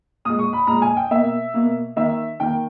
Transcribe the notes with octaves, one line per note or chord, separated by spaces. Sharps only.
A#2 G#3 D#6
C#6
B5
A#2 G#3 A#5
G#5
G5
B2 A#3 E5
B2 A#3
D#3 A#3 E5
D#3 A#3 G5